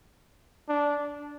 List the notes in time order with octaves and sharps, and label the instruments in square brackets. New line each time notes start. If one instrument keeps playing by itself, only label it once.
[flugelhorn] D4